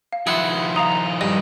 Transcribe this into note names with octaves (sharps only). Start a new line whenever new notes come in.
F5
D#3 F3 E4 G#4 F#5 C6
D#4 F5 A#5 D#6
G2 G4 D#5